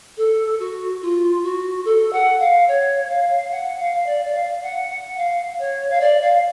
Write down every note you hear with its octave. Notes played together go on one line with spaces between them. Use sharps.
A4
F#4
F4
F#4
A4
F#5
F5
C#5
F5
F#5
F5
D5
D5
F5
F#5
F#5
F5
C#5
F5
D5
F5